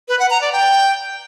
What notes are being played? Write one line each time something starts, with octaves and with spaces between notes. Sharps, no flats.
B4
F#5
A#5
D5
G5